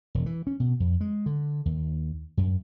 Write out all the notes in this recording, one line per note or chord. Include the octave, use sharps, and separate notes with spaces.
E1
E3
C#4
B2
F2
G#3
D3
D#2
F#2